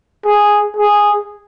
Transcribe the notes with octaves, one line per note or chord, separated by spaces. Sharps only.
G#4
G#4